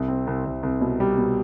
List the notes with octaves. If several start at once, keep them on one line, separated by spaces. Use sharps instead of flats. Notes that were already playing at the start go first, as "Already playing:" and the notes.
Already playing: C2
C4
C2
C2
C2
B2
G3
B2